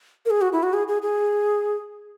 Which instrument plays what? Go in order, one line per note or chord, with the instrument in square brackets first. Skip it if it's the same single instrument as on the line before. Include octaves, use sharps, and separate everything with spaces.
[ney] A#4
G#4
F#4
E4
F#4
G#4
G#4
G#4